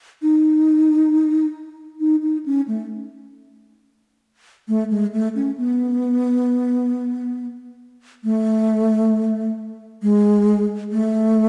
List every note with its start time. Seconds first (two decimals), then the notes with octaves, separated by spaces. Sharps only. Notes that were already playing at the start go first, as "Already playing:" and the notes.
0.22 D#4
2.00 D#4
2.22 D#4
2.46 C#4
2.68 A3
4.68 A3
4.90 G#3
5.13 A3
5.35 C#4
5.58 B3
8.24 A3
10.02 G#3
10.91 A3